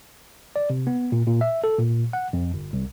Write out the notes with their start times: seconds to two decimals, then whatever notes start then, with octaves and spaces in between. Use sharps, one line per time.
0.56 D5
0.70 C3
0.87 B3
1.12 A#2
1.27 A#2
1.41 E5
1.64 A4
1.78 A#2
2.13 F#5
2.33 F2
2.54 G1
2.73 C2